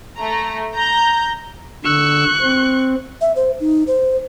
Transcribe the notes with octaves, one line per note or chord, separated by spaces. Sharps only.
A3 A#5
A#5 G6
D3 C#6 E6 F#6
C4
E5
C5
D#4
C5